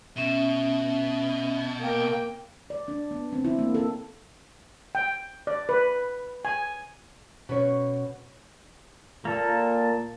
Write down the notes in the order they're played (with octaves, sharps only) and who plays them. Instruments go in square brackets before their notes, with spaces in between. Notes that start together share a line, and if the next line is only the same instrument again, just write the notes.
[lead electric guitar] B2 [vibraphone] C#4 E5
[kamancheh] A#3 G5
[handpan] D5
D4
B3
C4
E4
A#3
A4
[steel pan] G5
D5
B4
G#5
[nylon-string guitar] B2 C#4 C#5
[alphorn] A#2 [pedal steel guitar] A#3 A4